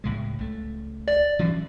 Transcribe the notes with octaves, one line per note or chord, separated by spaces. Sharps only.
C#2 A2 G#3
C#2 A3
D5
E3 F#3 C#4